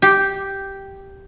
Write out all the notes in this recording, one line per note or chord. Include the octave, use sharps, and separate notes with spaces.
G4